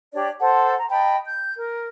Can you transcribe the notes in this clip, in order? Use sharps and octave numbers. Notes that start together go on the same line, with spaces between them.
D4 G4 C#5 D5
A4 C5 F#5 A5
A#5
D#5 G5 A5 B5
G6
A#4